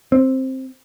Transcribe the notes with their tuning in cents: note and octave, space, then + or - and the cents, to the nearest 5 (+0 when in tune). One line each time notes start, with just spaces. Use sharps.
C4 +10